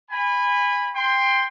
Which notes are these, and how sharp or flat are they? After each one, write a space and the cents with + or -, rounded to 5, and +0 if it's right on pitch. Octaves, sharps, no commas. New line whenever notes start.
G#5 -25 B5 +0
G5 +20 C6 +0